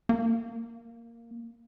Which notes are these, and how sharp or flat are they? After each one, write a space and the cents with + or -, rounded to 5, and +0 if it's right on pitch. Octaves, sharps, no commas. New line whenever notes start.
A#3 -5